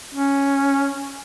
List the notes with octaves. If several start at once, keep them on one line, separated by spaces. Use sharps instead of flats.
C#4